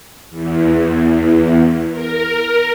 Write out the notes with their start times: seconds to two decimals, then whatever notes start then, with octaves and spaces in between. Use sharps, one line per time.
0.30 E2
1.90 A#4